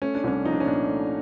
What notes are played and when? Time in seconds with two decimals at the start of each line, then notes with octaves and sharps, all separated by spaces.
0.02 A3 C#4
0.15 D4
0.24 C2 C#4
0.44 F3 D#4
0.53 D4
0.60 C#4
0.66 A#2 D4
0.88 A3